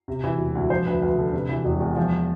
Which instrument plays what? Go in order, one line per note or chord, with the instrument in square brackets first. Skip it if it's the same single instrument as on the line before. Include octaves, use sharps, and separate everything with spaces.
[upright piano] C3
E3
E1
D2
F3 C5
D2 B4
D2 B4
D3 A4
C3 B4
E3
E1
E2
F3